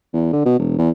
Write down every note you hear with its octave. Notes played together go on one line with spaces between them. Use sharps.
E2
D3
B2
E1
E2